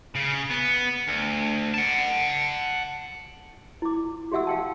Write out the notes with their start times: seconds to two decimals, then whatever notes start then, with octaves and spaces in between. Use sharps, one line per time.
0.16 C#3
0.51 B3
1.08 D2
1.74 F#5 A5
3.82 E4 D6
4.32 F#4 G4 E5 F#5 E6
4.47 F5 G5 A5